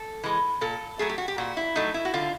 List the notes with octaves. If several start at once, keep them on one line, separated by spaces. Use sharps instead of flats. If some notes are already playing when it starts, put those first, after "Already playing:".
Already playing: A4
E3 G#3
A#2 A4
F#3 A3 G#4
G4
F#4
G4
A#2 F#4
E4
F#3 A3 D#4
E4
F#4
D3 F4